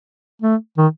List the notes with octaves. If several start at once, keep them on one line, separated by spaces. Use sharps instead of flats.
A3
D#3